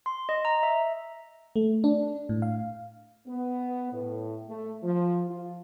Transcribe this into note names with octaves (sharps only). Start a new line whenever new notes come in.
C6
D#5
A#5
E5
A3
D4
A2
F5
B3
A2
A3
F3
F4